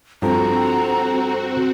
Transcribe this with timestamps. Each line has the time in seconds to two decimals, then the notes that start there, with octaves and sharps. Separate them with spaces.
0.22 G2 F3 C4 F#4 A4 A#5